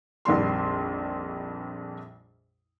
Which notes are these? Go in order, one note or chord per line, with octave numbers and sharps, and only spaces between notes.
A#1 F2 D#3 G3 C6